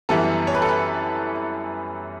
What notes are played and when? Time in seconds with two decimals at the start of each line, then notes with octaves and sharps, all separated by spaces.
0.09 F#2 E3 G3 B3 A4
0.47 C#5
0.54 B4
0.62 A4
0.69 B4